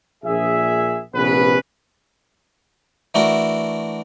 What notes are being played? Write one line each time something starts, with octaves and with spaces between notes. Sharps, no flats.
A#1 G#4 E5
A#1 C3 B3 C#4 B4
E3 A3 D4 F#4 A#4